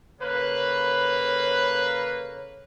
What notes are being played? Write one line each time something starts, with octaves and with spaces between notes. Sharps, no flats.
C#3 A#3 A4 B4 C#5